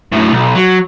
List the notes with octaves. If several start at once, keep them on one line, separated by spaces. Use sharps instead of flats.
F#2 A2
B1
F#3